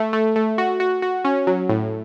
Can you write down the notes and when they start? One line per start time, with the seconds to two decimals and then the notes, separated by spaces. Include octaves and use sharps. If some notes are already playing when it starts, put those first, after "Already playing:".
Already playing: A3
0.13 A3
0.36 A3
0.58 F#4
0.80 F#4
1.02 F#4
1.25 C#4
1.47 F#3
1.69 A2